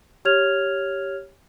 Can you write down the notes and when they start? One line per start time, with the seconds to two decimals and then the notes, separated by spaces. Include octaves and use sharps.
0.25 G4 C#5 F6 G#6 F7